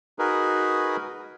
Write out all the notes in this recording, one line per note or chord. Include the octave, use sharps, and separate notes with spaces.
D#4 F#4 G#4 A#4 B4